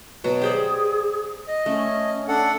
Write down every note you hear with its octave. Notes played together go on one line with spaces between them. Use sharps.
B2 F#3 F#4
G4 G#4 C5 D5
D#5
A3 C#4
D4 A4 F#5